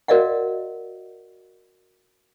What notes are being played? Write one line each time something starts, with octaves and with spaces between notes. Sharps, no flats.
F#4 A#4 D5 D#5 F5 F#5